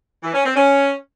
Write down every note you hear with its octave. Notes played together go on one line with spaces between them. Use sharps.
E3
C#4
C4
C#4